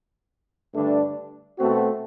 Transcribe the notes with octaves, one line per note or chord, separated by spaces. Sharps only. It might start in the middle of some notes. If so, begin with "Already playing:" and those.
G2 D3 A3 D4
B2 A3 C4 F#4